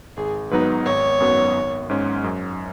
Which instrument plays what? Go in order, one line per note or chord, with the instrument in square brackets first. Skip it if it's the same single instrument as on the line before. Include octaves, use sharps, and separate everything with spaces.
[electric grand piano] G#1 [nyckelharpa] G#4
[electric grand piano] G#2 F#3 B3 D#4 [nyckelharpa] B4
[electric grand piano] G#1 [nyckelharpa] C#5
[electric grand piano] F#2 F#3 B3
G#1
G#2 G#3 C#4
F#2